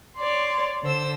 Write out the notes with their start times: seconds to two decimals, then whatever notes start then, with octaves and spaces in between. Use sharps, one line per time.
0.16 C#5 D5 C6
0.83 D3 C5 E6